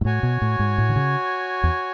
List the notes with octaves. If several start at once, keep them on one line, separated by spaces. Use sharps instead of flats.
G#2
A2 F#4 C#5 G#5
B2
A2
G#2
A2
D3
C#3
E2